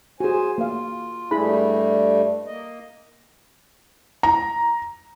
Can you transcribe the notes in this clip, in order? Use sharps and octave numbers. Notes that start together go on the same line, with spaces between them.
F#4 G#4 C5 G#5
A#3 F4 F5
G2 G3 A3 E4 G#4 B5
A#3 D#5
A#5